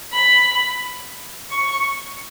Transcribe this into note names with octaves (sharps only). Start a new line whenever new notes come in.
B5
C#6